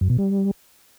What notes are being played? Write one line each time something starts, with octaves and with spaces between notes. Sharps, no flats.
F#2
B2
G3